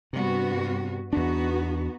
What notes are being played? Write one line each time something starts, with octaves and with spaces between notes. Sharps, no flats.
G2 C3 B3 F#4
E2 B3 D4 D#4 F#4